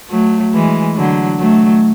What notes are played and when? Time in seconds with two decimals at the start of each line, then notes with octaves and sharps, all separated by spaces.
0.10 F#3 A3
0.53 E3 G#3
0.96 D3 F#3
1.39 F#3 A3